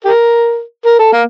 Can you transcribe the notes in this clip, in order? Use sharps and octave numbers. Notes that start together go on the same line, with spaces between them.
G4 A#4
A#4
A4
A#3